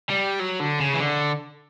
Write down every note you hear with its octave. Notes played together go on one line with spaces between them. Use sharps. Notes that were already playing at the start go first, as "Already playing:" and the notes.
G3
F#3
D3
C#3
E3
D3